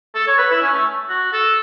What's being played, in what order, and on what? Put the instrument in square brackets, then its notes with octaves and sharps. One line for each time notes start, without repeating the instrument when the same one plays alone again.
[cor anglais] A4
C#5
B4
E4
C#4
A3
F#4
A4